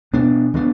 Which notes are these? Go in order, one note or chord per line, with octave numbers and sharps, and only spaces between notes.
B2 B3 D4
E3 B3 D4